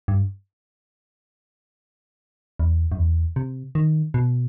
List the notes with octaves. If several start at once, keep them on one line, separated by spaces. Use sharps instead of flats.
G2
E2
F#2
E2
C3
D#3
B2